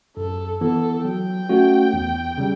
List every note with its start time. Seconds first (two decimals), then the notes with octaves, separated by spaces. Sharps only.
0.17 F#2 A4
0.61 E3 B3 A4
1.05 F#3 G5
1.49 A3 C#4 F#4
1.93 E2
2.38 C#3 G3